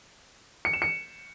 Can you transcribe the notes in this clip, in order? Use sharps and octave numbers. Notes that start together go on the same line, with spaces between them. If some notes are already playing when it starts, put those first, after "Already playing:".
C#7
E7
C#7